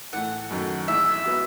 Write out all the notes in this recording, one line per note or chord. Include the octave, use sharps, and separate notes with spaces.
A2 E3 A3 F#5
F#2 D#3 F#3 A3
G#1 G#2 E3 E5
F#3 B3